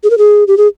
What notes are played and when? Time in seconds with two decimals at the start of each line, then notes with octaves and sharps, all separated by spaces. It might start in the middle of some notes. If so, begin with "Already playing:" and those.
0.04 G#4
0.10 A#4
0.18 G#4
0.48 G4
0.57 G#4